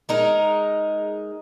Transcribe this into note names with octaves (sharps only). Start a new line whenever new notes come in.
G#3 D#4 A#4